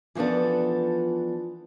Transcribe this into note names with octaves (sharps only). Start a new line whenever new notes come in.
E3 F3 B3 D4 A4